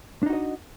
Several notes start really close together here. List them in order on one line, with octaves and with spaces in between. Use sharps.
D4 D#4 F#4 D#5